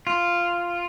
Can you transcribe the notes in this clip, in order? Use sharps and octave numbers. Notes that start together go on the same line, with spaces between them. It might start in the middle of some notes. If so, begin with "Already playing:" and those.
F4